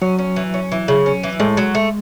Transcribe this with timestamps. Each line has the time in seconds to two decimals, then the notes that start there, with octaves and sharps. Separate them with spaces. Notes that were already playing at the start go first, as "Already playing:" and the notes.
0.02 F#3 C#4
0.19 C#4
0.36 E3
0.54 C#4
0.72 E3
0.88 C#3
1.06 C#4
1.23 E3
1.40 A2 G#3
1.57 F#3
1.75 A3